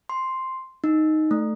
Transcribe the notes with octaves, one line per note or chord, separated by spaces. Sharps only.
C6
D#4
A3